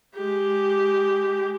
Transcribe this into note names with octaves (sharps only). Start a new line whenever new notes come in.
G#3 G4